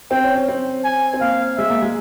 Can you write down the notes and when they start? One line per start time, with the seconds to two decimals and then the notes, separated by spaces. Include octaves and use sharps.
0.11 C4 G5
0.24 C#4
0.35 C#4
0.48 C4
0.84 G#5
1.14 C4
1.21 A#3 F5
1.58 G#3 E5
1.70 A#3
1.82 G#3